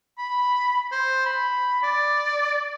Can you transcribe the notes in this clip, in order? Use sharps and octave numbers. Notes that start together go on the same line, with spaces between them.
B5
C5
B5
D5